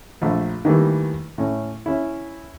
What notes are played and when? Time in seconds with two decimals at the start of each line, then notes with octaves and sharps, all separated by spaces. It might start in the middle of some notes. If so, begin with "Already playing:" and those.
0.22 A#1 A3
0.65 D#3 E3 G3 A3 A#3
1.38 A2 C#4
1.86 C#4 E4